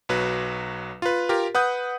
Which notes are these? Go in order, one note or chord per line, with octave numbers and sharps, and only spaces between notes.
B1 F#3 B4
F4 B4
F4 G4 A#4
B4 F#5 D#6 G6